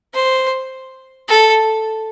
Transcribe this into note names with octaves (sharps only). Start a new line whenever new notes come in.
C5
A4